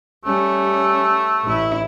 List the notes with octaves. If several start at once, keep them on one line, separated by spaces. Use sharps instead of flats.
G3 A3 C#4
A1 E4